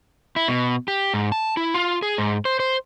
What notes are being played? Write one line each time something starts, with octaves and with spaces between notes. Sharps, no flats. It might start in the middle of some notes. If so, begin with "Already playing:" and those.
E4
B2
G4
G#2
A5
E4
F4
G#4
G#2
C5
C5